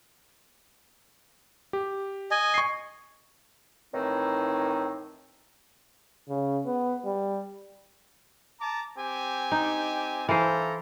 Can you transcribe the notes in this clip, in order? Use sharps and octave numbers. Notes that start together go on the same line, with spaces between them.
G4
D#5 G#5
C#6 C7
A2 D#3 E3 C4 D#4
C#3
B3
G3
A5 A#5 D6
C4 G4 G#5
D#4
E3 A4 C5 F5 A#5